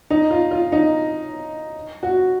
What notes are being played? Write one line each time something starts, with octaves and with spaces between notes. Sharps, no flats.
D#4
F4
F4
D#4
F#4